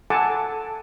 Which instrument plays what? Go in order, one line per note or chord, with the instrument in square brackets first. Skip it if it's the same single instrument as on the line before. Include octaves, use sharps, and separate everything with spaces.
[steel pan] A4 F#5 G#5 A5 D6